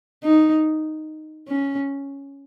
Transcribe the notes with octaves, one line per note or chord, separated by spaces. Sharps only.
D#4
C#4